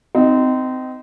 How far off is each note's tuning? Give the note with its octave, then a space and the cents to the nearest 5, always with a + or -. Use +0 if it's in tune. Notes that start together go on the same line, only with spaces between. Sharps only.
C4 -25 D#4 +0